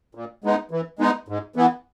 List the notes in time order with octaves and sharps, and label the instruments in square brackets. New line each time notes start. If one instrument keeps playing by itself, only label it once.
[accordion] A#2
G#3 B3 D#4
E3
G#3 B3 D#4
G#2
E3 B3